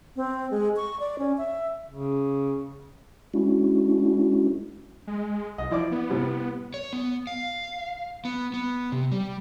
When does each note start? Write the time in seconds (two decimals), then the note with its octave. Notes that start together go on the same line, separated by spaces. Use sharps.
0.16 C4
0.51 G#3
0.76 C#6
1.00 D5
1.19 C#4
1.38 E5
1.91 C#3
3.34 G#3 C#4 D4 E4 F#4
5.07 G#3
5.58 C2 D#5
5.71 F3 E4 D5 D6
5.91 B3
6.09 A2 C3 G3
6.74 C#5
6.93 B3
7.27 F5
8.25 B3
8.54 B3
8.92 C3
9.12 G3